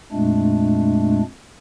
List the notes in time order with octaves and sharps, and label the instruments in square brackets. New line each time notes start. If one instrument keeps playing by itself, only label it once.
[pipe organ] F2 A#2 G#3 A3 D4